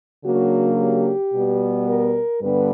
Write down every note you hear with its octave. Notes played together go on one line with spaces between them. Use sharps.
C#3 F#3 A#3 D4 F#4
G4
B2 G3 B3
A#4
G2 D3 G3 B3 B4